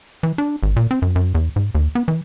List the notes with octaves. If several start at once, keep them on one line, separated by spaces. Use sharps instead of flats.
E3
D4
G#1
A#2
C4
F#2
F#2
E2
G#2
D#2
B3
E3